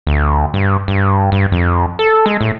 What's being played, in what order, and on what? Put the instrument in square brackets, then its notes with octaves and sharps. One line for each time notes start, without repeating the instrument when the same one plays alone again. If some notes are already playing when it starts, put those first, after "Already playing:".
[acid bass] D2
G2
G2
G2
F2
A4
G#3
A2